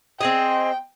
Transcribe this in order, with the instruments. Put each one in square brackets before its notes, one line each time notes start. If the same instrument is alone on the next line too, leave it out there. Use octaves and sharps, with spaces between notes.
[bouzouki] C4 G#4 D#5 [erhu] G5